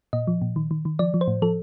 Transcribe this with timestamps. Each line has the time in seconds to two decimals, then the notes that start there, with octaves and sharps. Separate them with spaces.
0.13 A#2 D#5
0.27 F3
0.42 A#2
0.56 D#3
0.71 D#3
0.85 D#3
0.99 F3 D5
1.14 F3
1.21 C5
1.28 A2
1.42 F3 A4